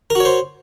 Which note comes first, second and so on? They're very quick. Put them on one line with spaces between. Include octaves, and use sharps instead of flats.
A#4 F#4 C#5 C5